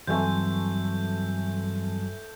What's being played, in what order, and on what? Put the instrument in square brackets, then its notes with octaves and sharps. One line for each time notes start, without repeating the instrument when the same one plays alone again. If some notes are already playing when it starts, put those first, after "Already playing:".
[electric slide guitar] G2 F#3 [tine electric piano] E3 C4 [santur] A3 G#5 C6 [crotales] G6